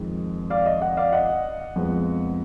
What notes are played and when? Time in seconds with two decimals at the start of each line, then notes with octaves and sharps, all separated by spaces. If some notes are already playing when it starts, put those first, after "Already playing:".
Already playing: F2 D#3 G#3
0.50 D5 F5
0.66 D#5
0.81 D#5 F#5
0.97 D5 F5
1.13 D#5 F#5
1.76 F2 F3 G#3 B3